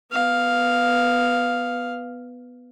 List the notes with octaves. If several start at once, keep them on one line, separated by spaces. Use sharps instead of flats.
B3 F5